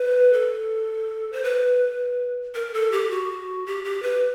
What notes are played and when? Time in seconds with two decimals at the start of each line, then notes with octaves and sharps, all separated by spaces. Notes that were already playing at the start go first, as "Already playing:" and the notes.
Already playing: B4
0.33 A4
1.33 C5
1.44 B4
2.55 A#4
2.74 A4
2.92 G4
3.10 F#4
3.66 G4
3.85 G4
4.03 B4